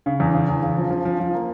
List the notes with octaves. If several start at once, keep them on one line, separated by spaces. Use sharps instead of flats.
C#3
E2
C#3
E2
C#3
F3
F3
F3
F3
A#3